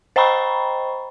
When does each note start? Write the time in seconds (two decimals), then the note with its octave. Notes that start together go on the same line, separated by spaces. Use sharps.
0.16 C5 D#5 G5 A#5 B5 C#6